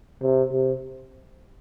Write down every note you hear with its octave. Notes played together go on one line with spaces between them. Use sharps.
C3
C3